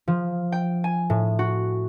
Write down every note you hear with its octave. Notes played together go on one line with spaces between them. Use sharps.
F3
G5
G#5
A2
F#4